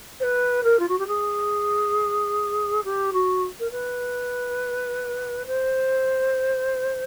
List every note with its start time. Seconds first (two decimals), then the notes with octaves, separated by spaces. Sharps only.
0.20 C5
0.23 B4
0.64 A#4
0.79 F4
0.88 F#4
0.99 G4
1.07 G#4
2.84 G4
3.13 F#4
3.60 A#4
3.71 B4
5.47 C5